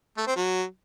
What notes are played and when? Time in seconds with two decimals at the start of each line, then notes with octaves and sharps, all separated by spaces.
0.17 A3
0.27 C4
0.36 F#3